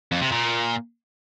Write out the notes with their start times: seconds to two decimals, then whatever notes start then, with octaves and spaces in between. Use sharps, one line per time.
0.12 F2
0.22 C3
0.32 A#2